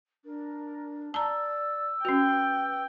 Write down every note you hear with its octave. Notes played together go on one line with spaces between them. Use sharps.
D4 A#4
D5 A5 A#5 E6
C#4 F#4 B4 G5